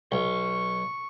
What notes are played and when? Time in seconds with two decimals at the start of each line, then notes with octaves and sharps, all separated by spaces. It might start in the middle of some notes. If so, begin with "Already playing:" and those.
0.12 B1 C#6